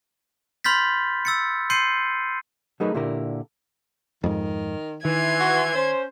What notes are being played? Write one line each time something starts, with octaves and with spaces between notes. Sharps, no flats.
B5 C6 F6 G6 A6 B6
E6 A6 C#7
C6 G6 C7 C#7 D#7
F#3 A3 D#4 G#4 A#4 B4
A#2 D3 E4 G4 A#4
F2 G#2 D#3
D#3 E3 C6 G#6
F#4
C#4 C5